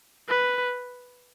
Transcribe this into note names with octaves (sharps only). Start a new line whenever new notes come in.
B4